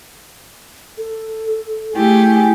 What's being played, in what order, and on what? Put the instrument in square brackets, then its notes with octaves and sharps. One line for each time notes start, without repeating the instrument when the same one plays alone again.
[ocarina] A4
[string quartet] A3 G4 G#4 [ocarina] E4